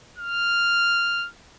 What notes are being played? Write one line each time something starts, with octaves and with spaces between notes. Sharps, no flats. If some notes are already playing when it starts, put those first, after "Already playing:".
F6